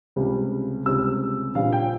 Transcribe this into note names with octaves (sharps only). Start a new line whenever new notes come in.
C#2 C3 G3
C#2 C3 G3 E6
A#1 A#2 G3 F5
G5